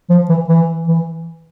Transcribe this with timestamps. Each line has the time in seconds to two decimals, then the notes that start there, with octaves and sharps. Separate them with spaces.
0.10 F3
0.29 E3
0.48 E3
0.88 E3